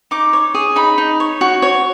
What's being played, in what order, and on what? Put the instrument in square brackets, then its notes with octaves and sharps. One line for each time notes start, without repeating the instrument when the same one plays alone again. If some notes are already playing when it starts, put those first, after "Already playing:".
[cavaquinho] D#4 D6
C#5
G#4
D#4 B5
D#4
C#5
F#4
C#5